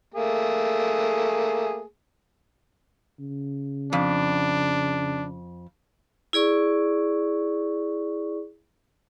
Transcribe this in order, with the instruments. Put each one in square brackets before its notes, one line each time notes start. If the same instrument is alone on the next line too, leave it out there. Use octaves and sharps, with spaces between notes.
[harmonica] A3 A#3 G#4
[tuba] C#3
[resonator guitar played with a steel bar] F2 [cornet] D4
[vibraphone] E4 G#4 D5 C#6